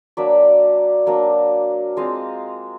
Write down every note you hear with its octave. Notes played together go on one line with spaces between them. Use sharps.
F#3 A#3 D4 D5 E5
F#3 A#3 D4
G#3 C4 F4 D#5 F5